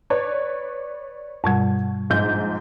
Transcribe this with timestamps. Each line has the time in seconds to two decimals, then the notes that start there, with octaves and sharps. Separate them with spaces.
0.10 B4 C#5 D5
1.44 G2 B2 G3
2.10 A#1 G#2 G6